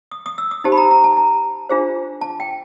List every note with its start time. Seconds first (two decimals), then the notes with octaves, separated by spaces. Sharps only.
0.11 D#6
0.26 D#6
0.38 E6
0.51 D#6
0.64 D#4 G4 C5 A5
0.72 B5
0.77 A#5
0.91 A#5
1.04 A5
1.17 A#5
1.69 D4 F4 G#4 C5
2.21 A5
2.40 G5